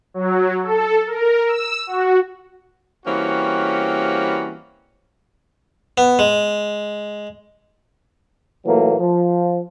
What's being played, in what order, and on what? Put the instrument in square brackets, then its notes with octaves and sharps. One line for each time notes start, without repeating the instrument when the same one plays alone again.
[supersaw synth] F#3
A4
A#4
E6
F#4
[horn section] E3 G3 A#3 C4 C#4 F#4
[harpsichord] B3
G#3
[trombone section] A#2 E3 F#3 A3 A#3
F3